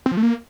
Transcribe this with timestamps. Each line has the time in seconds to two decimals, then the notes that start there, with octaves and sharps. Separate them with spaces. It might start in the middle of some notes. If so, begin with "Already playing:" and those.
0.06 C4
0.12 F3
0.17 A3
0.23 A#3